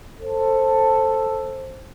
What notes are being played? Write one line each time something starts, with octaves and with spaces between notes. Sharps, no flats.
A4 C5